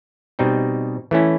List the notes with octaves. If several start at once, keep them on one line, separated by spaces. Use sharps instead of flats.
B2 G3 C4 D#4
E3 A3 C#4 E4